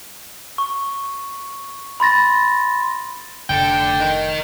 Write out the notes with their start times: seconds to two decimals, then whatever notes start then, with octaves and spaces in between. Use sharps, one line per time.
0.58 C#6
2.00 B5 C6 A6 A#6
3.50 F1 D3 A4 G5
4.00 D#4 A#4